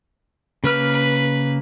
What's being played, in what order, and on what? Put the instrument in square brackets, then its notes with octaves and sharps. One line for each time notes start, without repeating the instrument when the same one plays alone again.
[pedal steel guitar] C#3 A#3 F6 [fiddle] B4